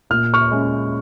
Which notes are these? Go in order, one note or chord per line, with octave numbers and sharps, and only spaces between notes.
A#2 F6
C#6 F6
G#3 C#4